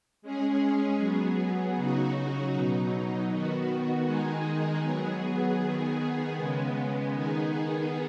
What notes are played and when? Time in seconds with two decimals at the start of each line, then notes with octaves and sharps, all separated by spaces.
0.22 G#3 C#4 G#4
0.98 F#3 B3 G#4
1.76 C#3 F#3 D#4 F#4
2.52 B2 F#3 D#4
3.29 D#3 B3 F#4
4.05 D#3 G#3 D#4 G#4
4.82 F#3 B3 G#4
5.58 D#3 B3 G#4
6.35 C#3 G#3 B3
7.12 D#3 B3 D#4 G#4